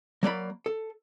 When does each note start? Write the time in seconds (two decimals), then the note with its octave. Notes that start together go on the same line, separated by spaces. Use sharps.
0.23 F#3 A#3 D5 B5
0.66 A4